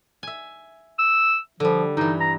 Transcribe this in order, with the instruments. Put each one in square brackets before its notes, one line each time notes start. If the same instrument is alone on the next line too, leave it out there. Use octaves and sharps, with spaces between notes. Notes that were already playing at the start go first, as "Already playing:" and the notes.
[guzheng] E5 G#5
[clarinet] E6
[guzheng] D3 G3 [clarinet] F3
[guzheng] G2 E3 [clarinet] D#4
[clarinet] A#5